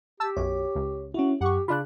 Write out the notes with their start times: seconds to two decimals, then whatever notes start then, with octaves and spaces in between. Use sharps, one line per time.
0.20 G4 A5 E6
0.37 B1 F#2 C#5
0.75 C#2
1.14 C#4 E4 F#4
1.41 F#2 G4 F#5 C#6
1.68 C#3 D4 F4 B5 F#6